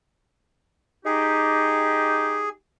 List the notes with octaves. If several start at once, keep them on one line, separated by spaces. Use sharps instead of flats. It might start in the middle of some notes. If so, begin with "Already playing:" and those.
D#4 G4 G#4